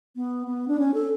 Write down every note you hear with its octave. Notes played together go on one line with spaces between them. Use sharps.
B3
B3
D4
C#4
A4